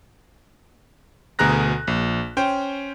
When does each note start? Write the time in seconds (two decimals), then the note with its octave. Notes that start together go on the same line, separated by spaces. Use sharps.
1.39 D2 B2 G#4 A#5 F#6 A#6
1.87 A#1
2.37 C#4 C5 G5